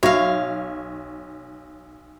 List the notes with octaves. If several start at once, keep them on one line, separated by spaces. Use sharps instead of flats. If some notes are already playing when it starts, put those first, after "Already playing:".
B1 F#4 C#5 E5 F5